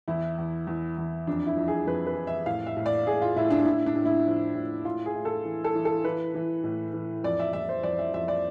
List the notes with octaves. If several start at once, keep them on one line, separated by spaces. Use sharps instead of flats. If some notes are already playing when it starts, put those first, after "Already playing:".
E2 E4
E2
E2
E2
F2 D4
E4
F2
G#4
F2 B4
B4
F2
E5
A2 F5
E5
A2
D5
A2 G#4
F4
A2 E4
D4
A2 E4
D4
A2
E4
F3
A2
A2 F4
G#4
A2
A4
E3
A4
E3
A4
E3 B4
E3
A2
E3
F2 D5
E5
F2 E5
C5
F2 D5
E5
F2 E5
D5